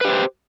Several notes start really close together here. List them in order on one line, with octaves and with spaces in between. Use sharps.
B4 G4 C5